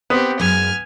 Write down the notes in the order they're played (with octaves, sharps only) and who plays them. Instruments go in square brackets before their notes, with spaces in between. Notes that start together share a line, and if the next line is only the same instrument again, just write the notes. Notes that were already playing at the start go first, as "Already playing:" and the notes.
[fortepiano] B3 [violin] C4 G4
[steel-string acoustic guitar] F#2 G#3 [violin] G#5 F6